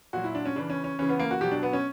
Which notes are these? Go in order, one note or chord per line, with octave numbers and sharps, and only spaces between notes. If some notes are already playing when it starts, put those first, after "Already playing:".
A#2 F#3 F#4
E4
D4
C#4
C#3 E3 D4
C#4
C#4
C#3 E3 C#4
B3
A#3
F#4
B2 F#3 G4
D4
B3
C#4